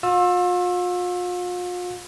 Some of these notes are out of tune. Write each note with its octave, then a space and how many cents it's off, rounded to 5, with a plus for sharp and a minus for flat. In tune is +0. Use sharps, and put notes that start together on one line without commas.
F4 +40 E6 +5